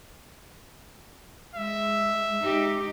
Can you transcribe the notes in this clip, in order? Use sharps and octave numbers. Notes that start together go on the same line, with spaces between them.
G#3 E5
G#3 D#4 G4